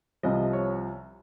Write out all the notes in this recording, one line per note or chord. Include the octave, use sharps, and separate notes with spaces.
C2 C3 F3 D#5
C#5